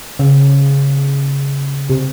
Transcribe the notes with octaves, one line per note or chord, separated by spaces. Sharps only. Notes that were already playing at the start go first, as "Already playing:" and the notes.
C#3
C3